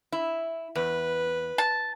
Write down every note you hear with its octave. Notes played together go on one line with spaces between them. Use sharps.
E4
E2 B4
A5